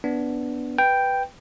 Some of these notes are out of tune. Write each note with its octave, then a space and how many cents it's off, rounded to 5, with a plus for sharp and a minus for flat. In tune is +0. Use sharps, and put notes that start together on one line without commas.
B3 +0 D4 -10
B4 +0 G5 +0